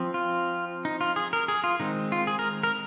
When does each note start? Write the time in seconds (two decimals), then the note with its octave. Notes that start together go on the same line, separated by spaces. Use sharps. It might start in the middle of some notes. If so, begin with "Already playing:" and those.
Already playing: F3 C4
0.14 F4
0.85 D#4
1.01 F4
1.16 G#4
1.33 A#4
1.48 G#4
1.64 F4
1.80 D#3 G#3 C4 D#4
2.12 F4
2.27 G#4
2.39 A#4
2.63 A#4